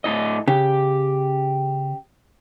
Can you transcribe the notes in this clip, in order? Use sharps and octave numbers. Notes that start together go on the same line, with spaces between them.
A2 E4 D#5
C#3 G4